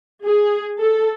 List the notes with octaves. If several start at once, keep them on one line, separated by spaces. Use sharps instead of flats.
G#4
A4